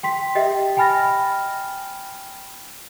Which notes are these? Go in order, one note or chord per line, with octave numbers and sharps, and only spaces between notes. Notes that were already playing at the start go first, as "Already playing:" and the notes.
G5 C6 B6
G4 D#5 E5 G5
G5 G#5 B5 F6 A6 A#6